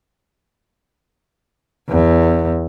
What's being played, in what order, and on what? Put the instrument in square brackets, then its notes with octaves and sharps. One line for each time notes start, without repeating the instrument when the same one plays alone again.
[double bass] E2